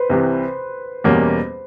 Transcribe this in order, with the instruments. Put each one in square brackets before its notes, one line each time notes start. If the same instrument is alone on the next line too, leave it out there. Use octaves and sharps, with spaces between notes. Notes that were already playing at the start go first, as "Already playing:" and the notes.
Already playing: [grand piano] B4 C5
[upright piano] C2 C3 E3
E2 B2 G3 A#3 C#4